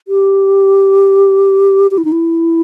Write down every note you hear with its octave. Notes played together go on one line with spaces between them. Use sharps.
G4
G4
E4
D#4
E4